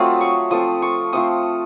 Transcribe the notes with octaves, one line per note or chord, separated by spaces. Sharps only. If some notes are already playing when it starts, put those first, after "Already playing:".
Already playing: F#3 A3 C4 F4 D#6
C#6
F3 A3 C4 D#6
C#6
F3 A3 C4 D#6